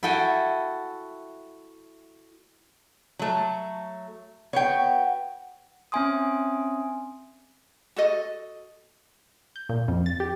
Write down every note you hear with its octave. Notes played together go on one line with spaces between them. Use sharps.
E4 F#4 A4 G5 G#5
F#3 A3
B3 F#4 C#5 G5
C4 C#4 E5 G#5 C6 D#6
F#4 A4 D#5
G6
A#2
F2
A6
G4